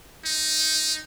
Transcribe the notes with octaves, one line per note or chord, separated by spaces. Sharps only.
D#4